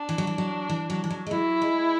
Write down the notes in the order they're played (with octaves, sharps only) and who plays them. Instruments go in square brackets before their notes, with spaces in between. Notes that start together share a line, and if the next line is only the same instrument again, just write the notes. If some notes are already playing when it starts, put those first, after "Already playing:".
Already playing: [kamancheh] D4
[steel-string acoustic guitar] E3
F#3
E3
F#3
E3
F#3
E3
F#3
G#3
[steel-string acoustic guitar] F#3 [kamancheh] E4
[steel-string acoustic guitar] G#3